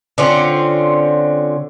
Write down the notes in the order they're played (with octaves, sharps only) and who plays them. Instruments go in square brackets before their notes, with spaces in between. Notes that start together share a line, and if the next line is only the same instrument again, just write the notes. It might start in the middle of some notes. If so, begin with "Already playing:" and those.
[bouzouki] D3 C4 C#4 F4